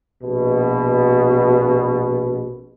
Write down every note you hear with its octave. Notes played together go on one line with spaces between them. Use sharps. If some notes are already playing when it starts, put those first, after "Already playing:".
A#1 B2